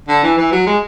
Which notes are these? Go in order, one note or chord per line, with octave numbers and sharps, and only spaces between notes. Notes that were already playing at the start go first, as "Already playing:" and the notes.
D3
E3
E3
F#3
G#3